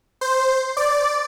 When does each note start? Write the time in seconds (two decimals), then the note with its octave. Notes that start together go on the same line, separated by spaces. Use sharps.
0.21 C5
0.77 D5